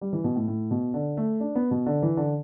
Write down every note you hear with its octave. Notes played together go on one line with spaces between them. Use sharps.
G3
E3
B2
A2
A2
B2
D3
A3
D4
B3
B2
D3
E3
D3